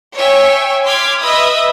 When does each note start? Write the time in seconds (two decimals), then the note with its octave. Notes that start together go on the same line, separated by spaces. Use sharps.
0.15 C#5 E5 G5 G#5
0.85 C6 D6 F6 G#6 B6
1.22 B4 D#5 E5 B5 D#6